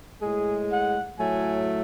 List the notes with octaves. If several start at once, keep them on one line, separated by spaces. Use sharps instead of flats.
A2 G#3 G#4
F#5
A2 F#3 A3 G#5